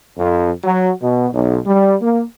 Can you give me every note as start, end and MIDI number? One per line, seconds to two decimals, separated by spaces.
0.18 0.51 41
0.64 0.93 54
1.02 1.28 47
1.34 1.58 35
1.67 1.96 55
2.02 2.24 58